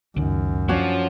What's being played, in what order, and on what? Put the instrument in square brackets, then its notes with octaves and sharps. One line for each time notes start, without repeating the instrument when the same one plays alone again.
[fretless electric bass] C#2 D#3 [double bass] F#2
[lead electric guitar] F3 [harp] C#4 D4 F#4